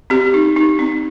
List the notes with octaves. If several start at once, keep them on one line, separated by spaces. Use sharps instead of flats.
C4 G4
D#4
D#4
C4